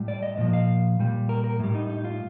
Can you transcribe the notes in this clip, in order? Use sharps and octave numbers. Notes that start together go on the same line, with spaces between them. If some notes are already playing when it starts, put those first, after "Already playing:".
Already playing: A2 G3
D5
D#5
A#2 F3 D#5
F5
A#2 G3
A#4
A#4
A2 G3
D#4
D#4
F4